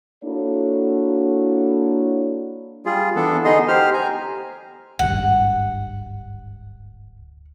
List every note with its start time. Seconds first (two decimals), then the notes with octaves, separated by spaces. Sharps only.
0.23 A#3 D4 E4 F#4 A4 C#5
2.86 G3 F4 G#4
3.16 E3 B3 D4 A4
3.45 D3 B3 D#4 G#4 D#5 C6
3.68 G4 C5 F6
3.94 G#5 A#5
4.99 D1 G#1 G2 F#5